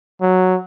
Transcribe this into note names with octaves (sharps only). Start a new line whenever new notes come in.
F#3